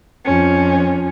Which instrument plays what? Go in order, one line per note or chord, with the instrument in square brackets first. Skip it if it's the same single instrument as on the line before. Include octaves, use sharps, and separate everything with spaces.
[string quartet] F2 F3 C#4